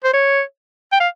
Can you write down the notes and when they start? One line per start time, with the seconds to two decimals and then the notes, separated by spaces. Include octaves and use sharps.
0.04 C5
0.13 C#5
0.92 G5
1.00 F5